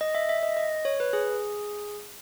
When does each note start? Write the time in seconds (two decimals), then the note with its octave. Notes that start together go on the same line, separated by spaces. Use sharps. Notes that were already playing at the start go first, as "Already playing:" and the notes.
0.01 D#5
0.15 E5
0.29 E5
0.43 D#5
0.57 D#5
0.85 C#5
1.00 B4
1.13 G#4